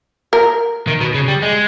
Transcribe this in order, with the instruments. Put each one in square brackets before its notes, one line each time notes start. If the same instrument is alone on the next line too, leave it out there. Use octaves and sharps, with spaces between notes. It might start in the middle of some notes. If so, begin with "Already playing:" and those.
[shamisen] A#4
[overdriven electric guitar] D#3
B2
C#3
G3
G#3